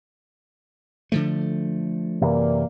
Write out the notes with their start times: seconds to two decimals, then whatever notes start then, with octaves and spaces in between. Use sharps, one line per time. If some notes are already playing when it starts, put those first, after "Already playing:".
1.12 D3 F3 A3
2.22 F#2 C3 E3 A#3 D5